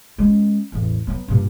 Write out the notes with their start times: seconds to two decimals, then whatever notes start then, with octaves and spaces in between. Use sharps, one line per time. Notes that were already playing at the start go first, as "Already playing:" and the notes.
0.18 G#3 C#4
0.72 A1 E2
1.07 F#3 B3
1.28 G2 A#2